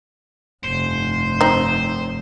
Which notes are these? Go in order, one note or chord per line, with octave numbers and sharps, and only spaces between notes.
F1 G2 C5
C4 D#4